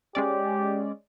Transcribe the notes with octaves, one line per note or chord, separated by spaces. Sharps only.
G#3 C#4 G4 D5